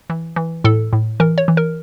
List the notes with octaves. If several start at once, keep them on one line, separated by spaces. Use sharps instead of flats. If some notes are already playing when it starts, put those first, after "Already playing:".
E3
E3
A2 A4
A2
E3 A#4
C#5
E3
A#4